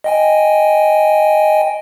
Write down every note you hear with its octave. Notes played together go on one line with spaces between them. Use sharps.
D#5 G5 G#5